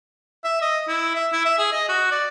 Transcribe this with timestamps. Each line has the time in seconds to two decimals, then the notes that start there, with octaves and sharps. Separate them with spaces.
0.44 E5
0.62 D#5
0.88 E4
1.15 E5
1.32 E4
1.45 E5
1.58 G#4
1.72 D#5
1.89 F#4
2.11 D5